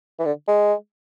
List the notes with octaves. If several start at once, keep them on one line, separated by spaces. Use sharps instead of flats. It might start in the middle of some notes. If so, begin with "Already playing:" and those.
E3
D3
G#3